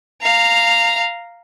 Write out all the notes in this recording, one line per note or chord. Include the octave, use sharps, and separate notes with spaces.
F5 A#5